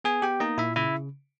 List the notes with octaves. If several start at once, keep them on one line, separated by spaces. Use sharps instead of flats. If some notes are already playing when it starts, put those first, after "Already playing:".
B3 G#4 G#5
B3 G4 G5
A#3 D#4 D#5
A#2 E4 E5
C#3 E4 E5